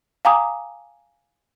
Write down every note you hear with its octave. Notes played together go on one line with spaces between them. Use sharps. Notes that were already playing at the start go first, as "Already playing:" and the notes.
F5 G5 G#5 A#5 D6 D#6